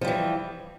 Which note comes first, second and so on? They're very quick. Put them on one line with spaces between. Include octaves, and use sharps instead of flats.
F3 G3 E3